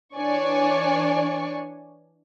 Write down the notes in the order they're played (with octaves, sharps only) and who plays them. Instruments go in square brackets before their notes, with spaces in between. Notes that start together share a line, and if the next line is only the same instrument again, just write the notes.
[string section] E3 D4 C#5 D5 G#5 C#6